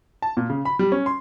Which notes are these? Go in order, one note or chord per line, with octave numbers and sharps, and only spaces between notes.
A5
A#2
C#3
B5
G3
C#4
C6